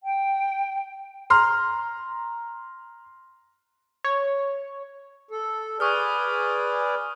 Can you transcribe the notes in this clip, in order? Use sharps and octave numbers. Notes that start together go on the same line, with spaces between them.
G5
A#5 C6 F6
C#5
A4
G#4 B4 D5 C#6 D#6 F6